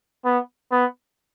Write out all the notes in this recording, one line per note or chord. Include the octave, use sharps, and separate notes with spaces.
B3
B3